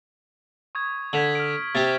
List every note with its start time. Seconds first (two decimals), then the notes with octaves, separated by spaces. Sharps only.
0.75 C#6 D#6 G#6
1.13 D3 G#6 B6 F#7
1.35 F6 D7
1.75 C3 G4 A6